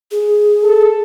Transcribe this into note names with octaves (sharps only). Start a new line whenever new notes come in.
G#4
A4